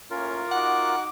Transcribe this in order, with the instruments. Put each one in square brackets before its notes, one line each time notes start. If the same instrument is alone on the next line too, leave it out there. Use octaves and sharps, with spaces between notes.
[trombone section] A2 A#3 C#4 [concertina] F4 A#4
[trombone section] D#4 F#4 [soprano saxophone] F#5 [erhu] D6